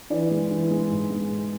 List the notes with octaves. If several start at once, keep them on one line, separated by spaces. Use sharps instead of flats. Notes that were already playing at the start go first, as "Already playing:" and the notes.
E3 D5
G#3
E3
G#3
G#2
G#3
G#2